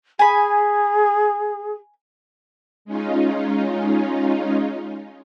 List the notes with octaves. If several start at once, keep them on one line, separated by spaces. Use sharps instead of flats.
G#4 G#5 B5
G#3 C#4 D#4 F4